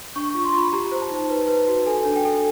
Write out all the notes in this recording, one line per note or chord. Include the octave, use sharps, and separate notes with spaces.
D4 C#6
C#6
F4
C6
F4
B5
G4 A#5
C5
A5
D#4
B4
B4
F#4
A4 G#5
D4
G5
A4